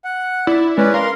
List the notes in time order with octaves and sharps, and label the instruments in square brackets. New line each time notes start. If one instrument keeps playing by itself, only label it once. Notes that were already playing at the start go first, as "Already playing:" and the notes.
[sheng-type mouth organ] F#5
[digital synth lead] E4 [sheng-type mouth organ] D5
[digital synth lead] G#3 [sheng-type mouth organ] C#4 B4 D5
[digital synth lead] A#4 [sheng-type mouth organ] F5 C6